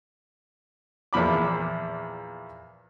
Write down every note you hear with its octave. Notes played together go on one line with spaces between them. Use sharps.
E2 A#2 F3 B5 D6